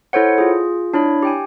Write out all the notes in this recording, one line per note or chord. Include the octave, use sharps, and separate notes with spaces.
E4 A4 C5 C#5 F#5
F4 G#4
D4 E4 C#5 B5
G4 G5 G#5